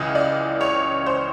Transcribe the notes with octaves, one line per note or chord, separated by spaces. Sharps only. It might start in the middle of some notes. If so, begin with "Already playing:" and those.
Already playing: C#2 C#3 E3 D#5
D5
C#5
C5